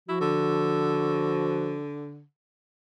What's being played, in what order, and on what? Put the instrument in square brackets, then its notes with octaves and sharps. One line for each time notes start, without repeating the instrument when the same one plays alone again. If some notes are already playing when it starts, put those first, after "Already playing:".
[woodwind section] F3 F#4 [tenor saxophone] E4
[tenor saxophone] D3